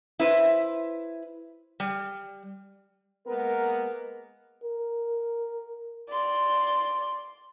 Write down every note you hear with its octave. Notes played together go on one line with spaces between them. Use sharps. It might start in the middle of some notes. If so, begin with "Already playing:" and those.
E4 B4 C5
G3
G#3 A#3 B3 A#4
A#4
D5 C6